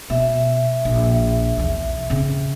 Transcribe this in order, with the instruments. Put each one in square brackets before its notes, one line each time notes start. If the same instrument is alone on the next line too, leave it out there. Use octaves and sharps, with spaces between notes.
[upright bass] B2 [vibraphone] E5
[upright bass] A#1
B1 E2
C#3 C4